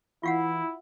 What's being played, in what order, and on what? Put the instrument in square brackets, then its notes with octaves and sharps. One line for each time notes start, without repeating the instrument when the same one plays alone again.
[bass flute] E3 [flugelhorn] E4 [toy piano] F4 F5 F#5